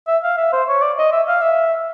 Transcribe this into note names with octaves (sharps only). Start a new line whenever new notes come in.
E5
F5
E5
C5
C#5
D5
D#5
E5
F5
E5